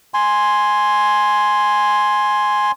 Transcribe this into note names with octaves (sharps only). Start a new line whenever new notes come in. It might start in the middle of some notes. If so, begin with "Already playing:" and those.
G#5 C6